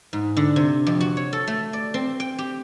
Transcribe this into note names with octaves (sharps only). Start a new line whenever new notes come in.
G#2
D3
C3
F2
F#4
C#5
A4
A3
D5
C4
G5
G4